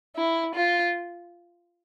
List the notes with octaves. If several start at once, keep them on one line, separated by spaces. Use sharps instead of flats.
E4
F4